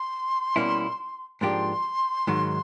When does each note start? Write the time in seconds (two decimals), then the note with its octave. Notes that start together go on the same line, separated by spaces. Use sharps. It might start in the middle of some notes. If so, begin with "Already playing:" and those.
Already playing: C6
0.56 B2 G3 A#3 C#4 E4
1.41 G#2 F3 A#3 D4 G4 C6
2.27 G#2 D#3 F#3